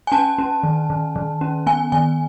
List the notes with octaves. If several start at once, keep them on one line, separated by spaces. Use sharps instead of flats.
G#5
C#4 A5
C#4
D#3
D#3
D#3
C#4
B3 G#5
D#3 G#5